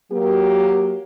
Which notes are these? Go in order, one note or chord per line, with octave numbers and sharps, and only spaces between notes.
F#3 A#3 G4